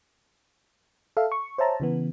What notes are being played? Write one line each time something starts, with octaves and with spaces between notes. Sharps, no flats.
A4 E5 F5
C#6
C5 C#5 E5 A5 A#5
C#3 E3 B3